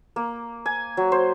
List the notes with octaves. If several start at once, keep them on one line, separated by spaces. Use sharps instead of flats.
A#3
G#5
F#3
C5